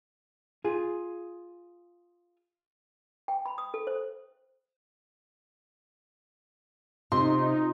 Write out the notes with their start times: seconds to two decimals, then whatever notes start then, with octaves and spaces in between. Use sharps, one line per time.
0.64 F4 G#4
3.28 G5
3.46 B5
3.58 D#6
3.74 A4
3.87 C5
7.12 C3 D#4 F4 C6